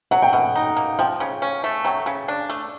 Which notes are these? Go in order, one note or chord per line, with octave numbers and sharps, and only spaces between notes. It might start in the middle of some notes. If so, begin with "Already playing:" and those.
F#3 F#5
G5
B2 F#5
D#4
A#3
F3 G5
C#3
C#4
A3
F#3 G5
C#3
D4
A3